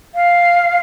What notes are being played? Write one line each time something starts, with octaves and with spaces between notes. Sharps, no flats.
F5